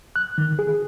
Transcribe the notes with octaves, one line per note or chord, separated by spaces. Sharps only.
F#6
D#3
G#4